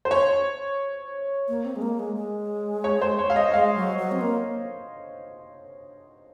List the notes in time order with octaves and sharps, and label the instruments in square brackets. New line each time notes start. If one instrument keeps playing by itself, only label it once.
[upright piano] C5
C#5
[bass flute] A#3
C4
G#3
A#3
G#3
G#3
[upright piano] C#5
C5
C#5
F5
D#5
[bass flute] G#3 [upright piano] F5
[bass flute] F#3
F#3
C4
A#3